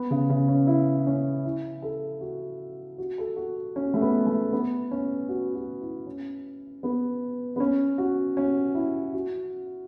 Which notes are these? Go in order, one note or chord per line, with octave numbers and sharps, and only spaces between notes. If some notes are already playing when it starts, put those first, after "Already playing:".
Already playing: B3
C#3
C#3
C#4
E4
C#4
E4
A4
F#4
F#4
A4
F#4
C#4
A3
B3
A3
B3
C#4
F#4
F#4
E4
C#4
B3
B3
C#4
F#4
C#4
E4
F#4